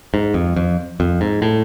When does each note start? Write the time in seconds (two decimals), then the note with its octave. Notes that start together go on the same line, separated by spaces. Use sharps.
0.14 G#2
0.34 F2
0.56 F2
1.00 F2
1.21 G#2
1.42 A2